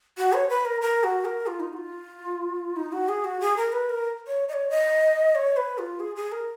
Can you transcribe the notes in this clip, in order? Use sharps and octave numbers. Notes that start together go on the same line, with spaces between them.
F#4
C#5
B4
A#4
A#4
F#4
A#4
F4
D#4
F#4
F4
D#4
F#4
G#4
F#4
G#4
A#4
B4
A#4
C#5
D#5
C#5
D#5
C#5
B4
F4
G#4
G#4
A#4